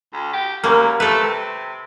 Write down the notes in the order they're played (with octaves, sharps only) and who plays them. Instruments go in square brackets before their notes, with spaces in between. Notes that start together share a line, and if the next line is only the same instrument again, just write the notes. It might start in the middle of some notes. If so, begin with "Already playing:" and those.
[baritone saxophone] D2
G4
[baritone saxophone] F#2 [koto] G3 A#3
[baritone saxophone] A3 [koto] A4 B4
[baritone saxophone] C3